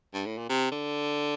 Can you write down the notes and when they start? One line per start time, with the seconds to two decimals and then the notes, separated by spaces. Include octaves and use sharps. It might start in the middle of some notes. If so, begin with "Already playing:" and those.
0.14 G2
0.26 A2
0.38 A#2
0.49 C3
0.72 D3